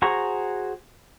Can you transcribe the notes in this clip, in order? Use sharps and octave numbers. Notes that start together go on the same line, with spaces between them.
F#4 G#4 C5 A#5 C#6